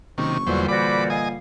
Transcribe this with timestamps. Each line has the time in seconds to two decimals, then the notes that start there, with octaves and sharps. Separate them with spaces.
0.18 F#1 C3 D#3 C#6
0.47 E2 A#2 D3 E3 F#3 G3 C5
0.68 F#4 C5 D5 B5 D6
1.10 D#5 F5 G#5